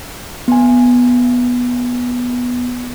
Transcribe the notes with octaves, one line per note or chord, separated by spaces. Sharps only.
B3 G#5